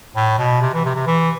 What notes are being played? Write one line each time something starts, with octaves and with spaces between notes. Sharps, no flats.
A2
B2
C3
E3
C3
C3
E3